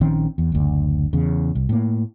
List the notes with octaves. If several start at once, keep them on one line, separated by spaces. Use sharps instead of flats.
A#1 D#3 C4 C#4
E2
F#1 D2
E2 C#3
C2
A2 A#3